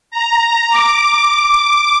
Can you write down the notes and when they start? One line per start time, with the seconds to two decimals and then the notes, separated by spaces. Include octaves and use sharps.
0.10 A#5
0.69 D6